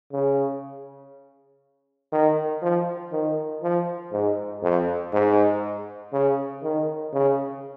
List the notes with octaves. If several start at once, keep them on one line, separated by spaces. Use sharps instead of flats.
C#3
D#3
F3
D#3
F3
G#2
F2
G#2
C#3
D#3
C#3